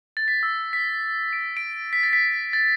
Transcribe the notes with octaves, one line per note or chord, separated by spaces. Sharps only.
A6
B6
E6
B6
D7
D7
B6
A6
B6
A6